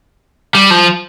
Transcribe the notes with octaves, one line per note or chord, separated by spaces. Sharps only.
G3
F3